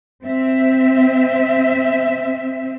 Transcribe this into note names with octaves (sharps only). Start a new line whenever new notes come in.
C4 E5